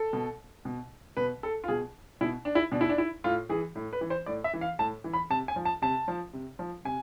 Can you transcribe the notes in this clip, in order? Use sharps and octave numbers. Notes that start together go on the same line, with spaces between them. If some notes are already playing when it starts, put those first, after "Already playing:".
Already playing: A4
B2
B2
B2 B4
A4
F4
B2 G#4
B2 E4
D4
E4
B2 D4
E4
D4
E4
A2 F4
E3 G#4
A2
B4
E3
C5
A2 D5
E5
E3
F5
A2 A5
E3
B5
C3 A5
G#5
F3
A5
C3 A5
F3
C3
F3
C3 G#5